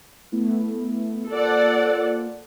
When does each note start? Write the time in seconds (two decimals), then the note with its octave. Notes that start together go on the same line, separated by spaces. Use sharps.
0.32 A3 B3 E4
1.31 A#3 F4 A4 C5 D5 F#5